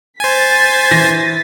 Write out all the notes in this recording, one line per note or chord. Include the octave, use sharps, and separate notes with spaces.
C5 G#5 A6 B6
E3 A#6